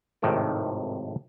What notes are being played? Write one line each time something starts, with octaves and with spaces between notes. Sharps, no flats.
G#1 F2 A2 C3 D#3 D5